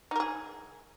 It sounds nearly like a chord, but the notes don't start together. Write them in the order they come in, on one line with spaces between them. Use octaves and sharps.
D#4 A#4 G#4